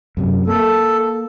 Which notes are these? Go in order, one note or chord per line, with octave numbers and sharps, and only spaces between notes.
F#2 C3 F#3
A#3 A4